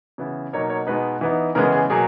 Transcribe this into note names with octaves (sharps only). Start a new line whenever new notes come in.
C#3 E3 B3 E4
B2 F#3 A#3 D#4 C#5
C#5
B2 G#3 B3 D#4 B4
E3 B3 D#4
C#3 E3 G#3 B3 A#4
G#4
B2 F#3 A#3 G#4